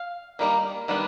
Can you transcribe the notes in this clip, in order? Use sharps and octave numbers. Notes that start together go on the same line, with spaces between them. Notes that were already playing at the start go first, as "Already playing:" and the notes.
Already playing: F5
D#3 G3 A#3 D#4
D#3 G3 B3 D4